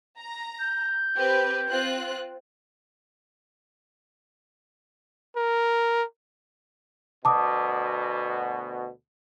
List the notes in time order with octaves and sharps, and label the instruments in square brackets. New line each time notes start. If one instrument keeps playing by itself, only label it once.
[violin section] A#5
[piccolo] G6
[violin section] C4 G4 B4
C4 F4 F#6
[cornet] A#4
[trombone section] D2 B2 [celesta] A5 D6 D#6